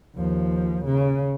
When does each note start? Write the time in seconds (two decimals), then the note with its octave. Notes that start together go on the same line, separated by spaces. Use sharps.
0.16 D#2 F3
0.85 C#3